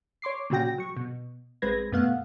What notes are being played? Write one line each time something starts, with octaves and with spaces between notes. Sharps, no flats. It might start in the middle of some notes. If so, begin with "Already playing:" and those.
C#5 C6 D6 C7
A#2 C#3 F#3 F#4 G5 A#6
F#3 C#6
B2
A1 G#3 C4 B4 G#6 A#6
F#2 B2 A3 B3 F5 F#5